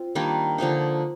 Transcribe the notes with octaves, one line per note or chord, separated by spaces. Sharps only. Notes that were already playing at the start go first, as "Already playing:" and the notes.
Already playing: C4 F4
D#3 G3 A#3 D4
D3 F3 A#3 D#4